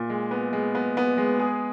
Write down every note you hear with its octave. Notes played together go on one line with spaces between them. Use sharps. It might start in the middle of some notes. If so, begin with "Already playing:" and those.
Already playing: A#2
G#3
B3
G#3
B3
B3
G#3
G#4